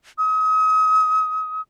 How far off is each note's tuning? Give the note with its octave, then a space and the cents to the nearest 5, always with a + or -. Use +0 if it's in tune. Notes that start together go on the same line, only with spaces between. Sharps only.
D#6 +35